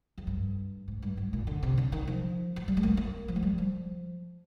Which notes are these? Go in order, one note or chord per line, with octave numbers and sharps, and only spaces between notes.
F2
G2
G#2
G2
G#2
A#2
D3
C3
D3
D#3
F3
F3
G3
G#3
A#3
A#3
F3
G#3
G3
F3